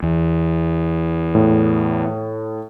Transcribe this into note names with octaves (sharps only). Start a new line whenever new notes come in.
E2
A2